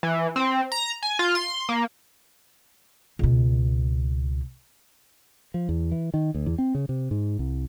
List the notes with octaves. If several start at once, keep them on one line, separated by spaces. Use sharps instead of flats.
E3
C4
A#5
G#5
F4
C6
A#3
C#2 B2
F3
E2
E3
D#3
D2
E2
C4
C#3
C3
G#2
C2